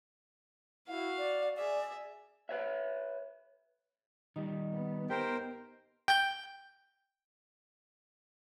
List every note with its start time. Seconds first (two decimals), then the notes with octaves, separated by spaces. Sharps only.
0.88 E4 F#4 F5
1.18 D5
1.57 G#4 D5 E5
2.49 B4 C#5 E5
4.36 D#3 G3 D#4
4.72 B3
5.10 G4 A#4 C5 G5
6.08 G5 G6